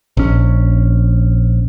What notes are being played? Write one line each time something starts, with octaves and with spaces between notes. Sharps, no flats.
A#1 C#4